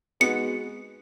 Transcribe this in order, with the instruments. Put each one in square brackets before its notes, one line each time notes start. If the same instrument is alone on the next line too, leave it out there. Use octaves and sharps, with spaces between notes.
[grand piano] G#3 B3 D#4 F#4 [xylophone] C#7